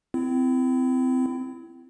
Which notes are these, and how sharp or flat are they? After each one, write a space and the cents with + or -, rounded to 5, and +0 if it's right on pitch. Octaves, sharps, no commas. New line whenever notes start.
C4 -25 E4 +25